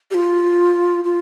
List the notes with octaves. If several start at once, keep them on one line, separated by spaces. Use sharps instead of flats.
G4
F4
F4